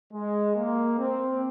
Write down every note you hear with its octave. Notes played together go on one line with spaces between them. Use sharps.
G#3
A#3
C4